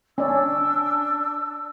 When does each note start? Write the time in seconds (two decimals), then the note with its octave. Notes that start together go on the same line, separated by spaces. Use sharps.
0.18 C#4 D4 D5 E6